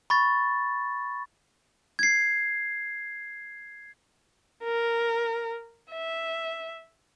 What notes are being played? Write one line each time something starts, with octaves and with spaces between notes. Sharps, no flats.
B5 C#6 A6
G#6 C7
A#4
E5